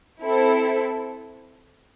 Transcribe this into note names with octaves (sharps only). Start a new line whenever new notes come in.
C4 E4 A4